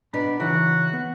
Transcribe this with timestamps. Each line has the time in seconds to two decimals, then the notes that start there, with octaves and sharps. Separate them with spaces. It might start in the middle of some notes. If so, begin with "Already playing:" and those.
0.13 B2 B3 D4 D5 A#5 B5
0.40 C#3 E3 D#4 E4 F#4
0.93 B3